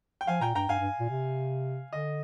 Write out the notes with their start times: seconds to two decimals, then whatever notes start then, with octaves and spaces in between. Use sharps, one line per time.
0.21 G5
0.27 F3 F5 G#5
0.41 A#2 G5 A#5
0.55 G2 G5 A#5
0.69 G2 F5 G#5
0.79 G2
1.00 A#2
1.10 C3
1.92 D3 D#5